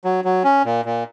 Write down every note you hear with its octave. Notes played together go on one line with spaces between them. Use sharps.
F#3
F#3
C#4
A#2
A#2